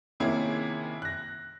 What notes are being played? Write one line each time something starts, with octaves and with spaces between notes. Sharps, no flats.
C3 D#3 A#3 C#4 E4 G#4
F#6 A#6